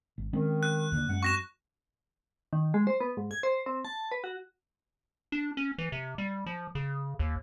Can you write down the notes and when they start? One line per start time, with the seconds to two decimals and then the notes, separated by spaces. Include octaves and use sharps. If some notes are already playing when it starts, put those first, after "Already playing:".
0.18 G#1
0.33 D#3 G#3 C4 C#4
0.63 F#6
0.92 D#2 D3
1.09 F#2 G#3 F#5
1.23 C4 F#4 C#6 A#6 E7
2.53 D#3
2.74 G#3
2.87 C5
3.00 B3
3.17 G#2
3.31 G#6
3.43 C5
3.66 C4
3.85 A5
4.12 B4
4.24 F#4
5.32 D4
5.57 C#4
5.78 E3
5.92 C3
6.18 G3
6.46 F3
6.75 C#3
7.19 D#2